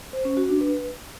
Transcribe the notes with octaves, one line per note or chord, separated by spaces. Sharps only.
C5
C#4
F#4
D4
B4